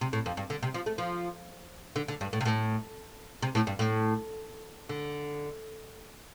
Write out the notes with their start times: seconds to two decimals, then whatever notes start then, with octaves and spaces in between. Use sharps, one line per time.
0.01 C3
0.13 A2
0.26 F2
0.37 G2
0.50 D3
0.63 C3
0.74 F3
0.86 A3
0.98 F3
1.96 D3
2.08 D3
2.21 G2
2.33 A2
2.41 C3
2.45 A2
3.42 C3
3.55 A2
3.67 G2
3.79 A2
4.89 D3